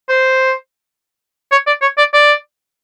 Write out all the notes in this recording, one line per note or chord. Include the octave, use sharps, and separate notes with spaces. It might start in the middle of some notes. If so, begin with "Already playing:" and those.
C5
C#5
D5
C#5
D5
D5